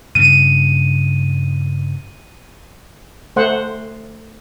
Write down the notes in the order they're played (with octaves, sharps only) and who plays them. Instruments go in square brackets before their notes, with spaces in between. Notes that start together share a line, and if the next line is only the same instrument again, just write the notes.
[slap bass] G2 C#3 [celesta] D#7
[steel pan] A3 C5 F#5